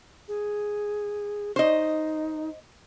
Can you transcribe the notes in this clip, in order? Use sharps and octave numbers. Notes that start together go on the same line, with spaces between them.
G#4
D#4 C5 D#5